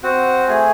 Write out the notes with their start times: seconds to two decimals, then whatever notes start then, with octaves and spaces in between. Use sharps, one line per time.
0.03 C4 F#4 F#5
0.48 A3 G#4 G#5